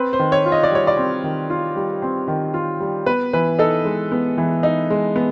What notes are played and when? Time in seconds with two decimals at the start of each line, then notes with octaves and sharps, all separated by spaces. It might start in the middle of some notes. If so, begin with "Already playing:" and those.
Already playing: C4 B4
0.13 C5
0.19 D#3
0.32 C#5
0.46 F4
0.52 D#5
0.63 D5
0.72 G3 C#5
0.87 D5
0.97 C4
1.24 D#3
1.50 F4
1.76 G3
2.02 C4
2.28 D#3
2.54 F4
2.80 G3
3.06 B3 B4
3.33 E3 B4
3.59 D#4 A4
3.85 G#3
4.12 B3
4.38 E3
4.63 D#4
4.90 G#3
5.16 B3